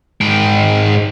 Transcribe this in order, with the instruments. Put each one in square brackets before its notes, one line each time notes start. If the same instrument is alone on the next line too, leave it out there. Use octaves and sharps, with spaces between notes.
[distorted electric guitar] G#2 G5